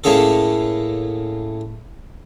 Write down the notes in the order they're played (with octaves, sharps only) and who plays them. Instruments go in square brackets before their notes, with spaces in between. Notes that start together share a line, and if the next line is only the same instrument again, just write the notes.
[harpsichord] A2 A3 A#3 C#4 G#4 A4